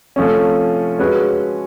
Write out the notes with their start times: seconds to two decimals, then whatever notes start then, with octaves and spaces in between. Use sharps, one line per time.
0.16 C3 F3 A3 C#4
0.99 G#3 C#4 F#4 B4